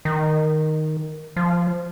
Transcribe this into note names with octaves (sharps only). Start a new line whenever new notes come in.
D#3
F3